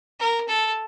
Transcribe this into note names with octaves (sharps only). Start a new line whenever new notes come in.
A#4
A4